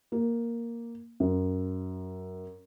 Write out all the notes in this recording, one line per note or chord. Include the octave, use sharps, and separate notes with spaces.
A#3
F#2